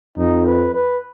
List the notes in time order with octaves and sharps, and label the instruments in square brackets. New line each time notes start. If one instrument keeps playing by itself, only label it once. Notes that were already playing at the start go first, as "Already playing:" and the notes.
[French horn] F2 [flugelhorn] D#4
[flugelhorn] B4
B4